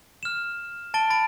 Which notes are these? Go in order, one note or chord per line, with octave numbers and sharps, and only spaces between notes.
F6 E7
A5 A6 D7 G7
B5 A6 D7